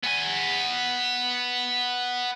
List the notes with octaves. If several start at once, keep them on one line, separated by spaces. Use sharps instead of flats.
B3 G#5